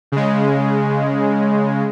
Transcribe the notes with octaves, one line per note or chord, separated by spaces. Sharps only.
C#3 G#3